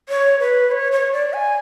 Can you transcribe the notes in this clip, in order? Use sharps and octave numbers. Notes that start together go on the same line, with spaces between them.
C#5
B4
C#5
C#5
D5
G#5